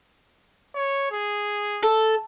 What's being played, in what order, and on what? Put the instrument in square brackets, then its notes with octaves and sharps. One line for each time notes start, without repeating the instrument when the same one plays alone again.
[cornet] C#5
G#4
[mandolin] A4